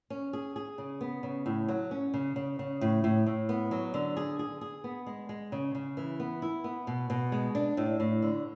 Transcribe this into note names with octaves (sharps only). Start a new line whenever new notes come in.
C#4
G#4
G#4
C#3
B3
C#3
A2
F#3
C#4
C#3
C#3
C#3
A2
A2
A2
B3
F#3
D3
G#4
G#4
G#4
B3
G#3
G#3
C#3
C#3
E3
B3
E4
B3
B2
B2
G#3
D4
A2
A2
D3